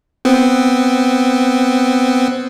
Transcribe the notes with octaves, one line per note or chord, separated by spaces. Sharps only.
B3 C4